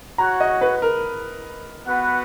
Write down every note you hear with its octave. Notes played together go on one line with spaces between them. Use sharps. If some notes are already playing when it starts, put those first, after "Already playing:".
F#4 C#5 F#5 A#5
D#5
B4
A#4
B3 F#4 B4 F#5